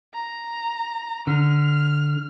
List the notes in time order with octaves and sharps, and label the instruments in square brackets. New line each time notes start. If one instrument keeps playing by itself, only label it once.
[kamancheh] A#5
[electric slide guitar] D3 [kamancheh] F6